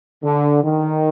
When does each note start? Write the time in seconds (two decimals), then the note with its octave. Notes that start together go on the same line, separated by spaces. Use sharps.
0.23 D3
0.64 D#3